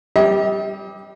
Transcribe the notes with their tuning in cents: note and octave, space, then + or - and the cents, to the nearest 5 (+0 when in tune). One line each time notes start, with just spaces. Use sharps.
G3 -10 G4 +15 D#5 +45